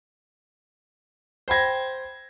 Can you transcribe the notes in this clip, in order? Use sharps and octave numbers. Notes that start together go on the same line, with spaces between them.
C5 G5 B5 G#6 A#6